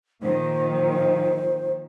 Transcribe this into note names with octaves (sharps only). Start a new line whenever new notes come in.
A#2 D#3 F3 C5